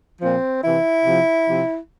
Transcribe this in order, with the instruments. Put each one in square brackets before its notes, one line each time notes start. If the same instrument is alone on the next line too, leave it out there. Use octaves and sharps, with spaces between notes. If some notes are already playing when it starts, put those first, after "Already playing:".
[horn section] A#2 F3 C4
C3 E3 E4
C3 F3
C3 F3